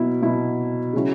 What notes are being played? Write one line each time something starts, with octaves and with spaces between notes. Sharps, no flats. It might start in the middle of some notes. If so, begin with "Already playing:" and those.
Already playing: B2 F#3 E4
B2 F#3 E4
C#3 F#3 C#4 E4